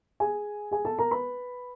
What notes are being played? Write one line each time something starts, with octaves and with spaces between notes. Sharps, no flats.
G#4 G#5
G#4 G#5
A4 A5
A#4 A#5
B4 B5